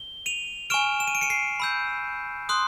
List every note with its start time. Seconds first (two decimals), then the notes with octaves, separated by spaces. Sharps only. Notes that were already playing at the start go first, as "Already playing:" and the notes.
Already playing: G7
0.26 D#7 F7
0.70 G#5 C#6 F6 D7 E7
1.00 E7
1.07 D#7
1.15 D7
1.21 C#7 D#7
1.30 C7 D7
1.60 B5 E6 G6
2.49 C6 D#6 F#6